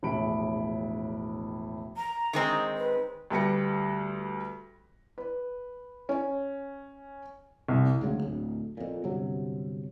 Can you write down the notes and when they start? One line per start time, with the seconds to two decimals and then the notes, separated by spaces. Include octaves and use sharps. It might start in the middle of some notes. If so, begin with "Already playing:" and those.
0.03 E1 A#1 A2 B5 D7
1.97 A#5
2.33 D#3 G#3 C4
2.77 B4
3.30 D2 G3 B4 G5 A#6 C#7
5.18 B4
6.09 C#4
7.68 C2
8.01 D2 G#2 C#3 F#3
8.23 D1 D2
8.77 F2 A#2
9.04 G1 C3 F#3